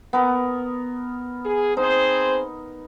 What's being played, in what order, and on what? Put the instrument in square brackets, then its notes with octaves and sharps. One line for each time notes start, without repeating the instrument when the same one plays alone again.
[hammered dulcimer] B3 A#4
[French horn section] G#4
[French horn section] C4 G#4 C5 [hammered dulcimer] D#4